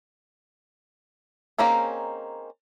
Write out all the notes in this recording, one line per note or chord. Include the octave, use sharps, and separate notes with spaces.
A#3 C4 C#4 D#4 G#4